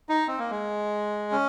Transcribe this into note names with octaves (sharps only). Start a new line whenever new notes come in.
D#4
C4
A#3
G#3
C#4